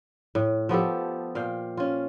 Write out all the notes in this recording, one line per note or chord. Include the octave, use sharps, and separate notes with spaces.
A2
F3 B3 G4 A4
A#2 F5 G5
C#4 F4